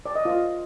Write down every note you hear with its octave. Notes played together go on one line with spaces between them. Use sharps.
D5
D#5
F4